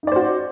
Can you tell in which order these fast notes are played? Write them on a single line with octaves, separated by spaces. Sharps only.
D#4 D5 C5 F#4